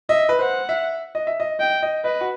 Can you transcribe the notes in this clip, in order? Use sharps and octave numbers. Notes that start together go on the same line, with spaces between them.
D#5 E5
B4
C5 F#5
E5
D#5
E5
D#5
D#5 G5
D#5
B4 D#5
F#4